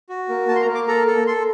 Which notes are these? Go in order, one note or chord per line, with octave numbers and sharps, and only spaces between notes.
F#4
A#3
A#3 A5
C6
A#5
A#3
D6
A4 A#5
A4
A4 C6